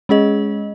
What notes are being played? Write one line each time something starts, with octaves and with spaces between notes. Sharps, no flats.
G#3 C#4 G#4 D#5